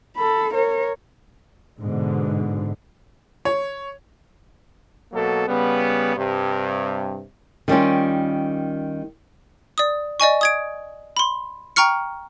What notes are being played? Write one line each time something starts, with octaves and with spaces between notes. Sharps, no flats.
A4 B5
A#4 C#5
G#2 B2 D3
C#5
B2 F#3 A#3 A4
C#3 G3 B3
G2 C3
D#3 G3 C#4 F4
D5 D#6
D5 D#5 G#5 C#6
D#6 G#6 D7
B5 C6
G5 A#5 C#6 F6 C#7